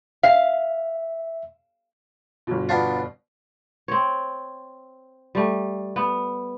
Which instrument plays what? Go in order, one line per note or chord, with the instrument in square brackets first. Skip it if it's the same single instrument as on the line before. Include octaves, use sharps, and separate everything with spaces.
[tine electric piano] E5 [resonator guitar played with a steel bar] F5
[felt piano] G1 B2
[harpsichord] B3 D4 F4
[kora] C4 C#5
G3 A3
B3